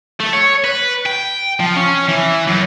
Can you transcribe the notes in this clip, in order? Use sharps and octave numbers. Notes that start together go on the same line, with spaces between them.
A3
C#5
B4
G5
F3
C#4
E3
F#2